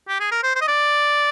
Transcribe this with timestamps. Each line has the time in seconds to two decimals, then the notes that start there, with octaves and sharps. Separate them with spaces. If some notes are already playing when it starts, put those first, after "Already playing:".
0.08 G4
0.20 G#4
0.31 A#4
0.43 C5
0.56 C5
0.61 D#5
0.68 D5